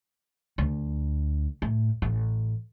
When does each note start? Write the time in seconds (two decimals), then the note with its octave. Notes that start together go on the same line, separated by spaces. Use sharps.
0.58 D2
1.62 A2
2.02 A1